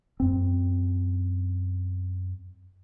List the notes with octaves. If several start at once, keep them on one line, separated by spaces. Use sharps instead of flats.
F#2 C4